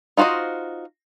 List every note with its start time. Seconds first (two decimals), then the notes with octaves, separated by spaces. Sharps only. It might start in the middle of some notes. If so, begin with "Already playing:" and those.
0.17 D#4 F4 F#4 C5 D#5